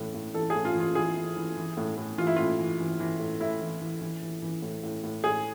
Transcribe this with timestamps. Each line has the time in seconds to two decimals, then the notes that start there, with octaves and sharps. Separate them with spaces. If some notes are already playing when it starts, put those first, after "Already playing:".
Already playing: A2 E3
0.14 A2
0.34 E3 A4
0.50 G#4
0.55 A2
0.65 F4
0.75 E3
0.80 F4
0.95 E3 G#4
1.16 E3
1.36 E3
1.57 E3
1.77 A2
1.97 A2
2.18 E3 F4
2.27 E4
2.36 A2 F4
2.59 E3
2.79 E3
3.00 E3
3.20 A2
3.40 A2 E4
3.61 E3
3.81 E3
4.01 E3
4.22 E3
4.42 E3
4.62 A2
4.83 A2
5.03 A2
5.24 A2 G#4